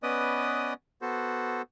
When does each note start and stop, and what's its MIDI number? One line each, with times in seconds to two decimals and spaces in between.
0.03 0.74 59
0.03 0.74 61
0.03 0.74 71
0.03 0.74 74
0.03 0.74 75
0.03 0.74 87
1.02 1.62 59
1.02 1.62 66
1.02 1.62 69
1.02 1.62 72